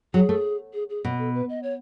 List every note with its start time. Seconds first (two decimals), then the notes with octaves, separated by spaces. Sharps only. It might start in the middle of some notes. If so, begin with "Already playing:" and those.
0.14 F#3 G#4
0.29 A3
0.73 G#4
0.90 G#4
1.05 B2
1.19 A4
1.34 B4
1.49 D#5
1.63 C#5